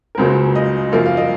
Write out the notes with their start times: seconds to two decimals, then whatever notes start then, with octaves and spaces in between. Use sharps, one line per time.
0.15 A#4
0.18 C#2 C#3 F#3 A#3 C5
0.55 D#5
0.92 F#2 F3 A#3 F5
1.06 F5
1.17 D#5